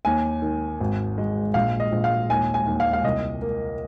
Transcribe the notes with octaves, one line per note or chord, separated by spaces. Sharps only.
D#2 G#5
D#3
G#1
G#3
A#1 F5
D#5
A#1
F5
D#2 G#5
G#5
D#2
F5
F5
C2 D#5
A#3